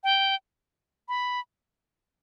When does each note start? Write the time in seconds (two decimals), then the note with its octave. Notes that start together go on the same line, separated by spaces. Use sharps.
0.04 G5
1.08 B5